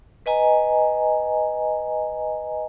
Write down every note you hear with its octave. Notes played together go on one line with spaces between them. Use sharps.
B4 D#5 G#5 A#5